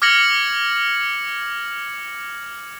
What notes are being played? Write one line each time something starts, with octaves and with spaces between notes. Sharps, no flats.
D6 F6 G#6 A#6 C#7 F#7